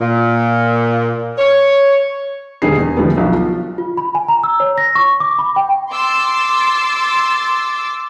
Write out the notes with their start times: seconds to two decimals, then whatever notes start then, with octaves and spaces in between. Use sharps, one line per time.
0.01 A#2
1.38 C#5
2.62 E1 D3 D#3 G3 G#4 C7
2.78 E2
2.96 D3 E3 F3 G3 A3 B3
3.17 B1 F3 F#4
3.32 F4
3.78 F4
3.97 B5
4.15 G#5
4.28 A#5
4.44 E6
4.60 C#5
4.78 A#6
4.95 C#6
5.20 D6
5.39 B5
5.56 G5
5.92 C6 D6 E6 A6